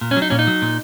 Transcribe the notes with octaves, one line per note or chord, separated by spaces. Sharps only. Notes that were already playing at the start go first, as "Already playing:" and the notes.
A#2
C#4
F#3
D#4
A#2 C#4
D#4
F#3
A#2